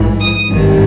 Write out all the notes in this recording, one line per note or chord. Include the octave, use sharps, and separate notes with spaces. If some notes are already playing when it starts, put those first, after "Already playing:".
Already playing: A#1 G#2 E3
D#6
G#1 G2 D#3 G3